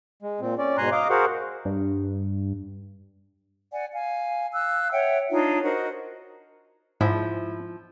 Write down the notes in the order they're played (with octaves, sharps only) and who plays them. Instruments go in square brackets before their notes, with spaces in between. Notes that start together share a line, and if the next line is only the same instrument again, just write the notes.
[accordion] G#3
A#2 C4
C#4 D5
G#2 B2 G#5 A#5 C6 F#6
D#5 F5 A#5 D6
F#4 G#4 A#4 C5 F5 F#5
[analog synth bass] G2
[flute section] D5 F#5 G#5
F5 G#5
F5 E6 F#6
C#5 E5 F#5 G5
D4 D#4 F4 C#5
F#4 A#4 C5 D#5
[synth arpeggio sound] G#2 [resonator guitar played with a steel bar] F3 [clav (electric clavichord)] E4